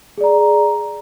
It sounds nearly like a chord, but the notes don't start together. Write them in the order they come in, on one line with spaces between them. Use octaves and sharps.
G#4 D5 A#5